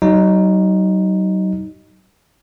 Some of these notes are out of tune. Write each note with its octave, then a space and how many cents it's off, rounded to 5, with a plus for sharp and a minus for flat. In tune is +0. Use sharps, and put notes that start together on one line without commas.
F#3 +40 D#4 +0